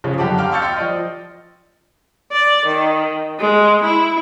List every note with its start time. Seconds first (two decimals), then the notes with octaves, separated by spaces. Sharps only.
0.04 C#3 F3 C#4
0.18 F#2 D3 G4 F#5 A5 D6
0.37 F5 G5 A5 D6 F6
0.51 F5 C#6 E6 G6 A6 C#7
0.62 G5 C6 F6
0.76 F3 D5 D#5
2.32 D5
2.66 D#3
3.39 G#3
3.84 E4